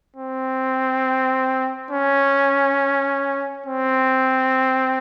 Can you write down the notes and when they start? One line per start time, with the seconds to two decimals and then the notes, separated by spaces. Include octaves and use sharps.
0.16 C4
1.90 C#4
3.66 C4